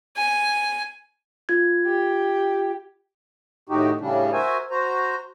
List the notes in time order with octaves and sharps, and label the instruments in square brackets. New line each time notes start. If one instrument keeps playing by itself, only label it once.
[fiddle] G#5
[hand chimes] F4 G#6
[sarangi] G4
[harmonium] A2 D#3 D#4 F#4 G4
A2 C#3 G3 D4
F#4 A#4 C5 E5 G#5
F#4 C5 A#5